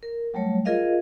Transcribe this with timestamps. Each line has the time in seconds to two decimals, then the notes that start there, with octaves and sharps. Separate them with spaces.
0.03 A#4
0.34 F#3 G3 A3 C#5
0.65 F4 G#4 A#4 D#5 F5